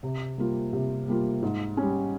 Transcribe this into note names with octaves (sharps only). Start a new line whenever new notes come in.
C3
G3 A#3 F4
C3
G3 A#3 F4
G#2
G3 C#4